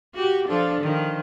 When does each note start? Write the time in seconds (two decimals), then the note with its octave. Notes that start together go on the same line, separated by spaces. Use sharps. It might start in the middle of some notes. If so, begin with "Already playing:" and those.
0.15 F#4 G4
0.47 F3 D4 A4
0.81 D#3 F3